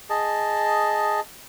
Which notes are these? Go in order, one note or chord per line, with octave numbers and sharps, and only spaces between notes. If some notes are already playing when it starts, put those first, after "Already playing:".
G#4 D#5 A5